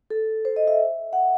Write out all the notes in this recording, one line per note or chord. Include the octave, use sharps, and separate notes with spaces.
A4
C5
D#5
E5
F#5